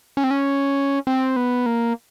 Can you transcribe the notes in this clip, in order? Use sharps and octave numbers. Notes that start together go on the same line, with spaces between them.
C#4
C4
C#4
C4
B3
A#3